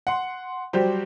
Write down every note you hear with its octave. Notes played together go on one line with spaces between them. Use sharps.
F#5 C6
F#3 G3 F#4 G4 C5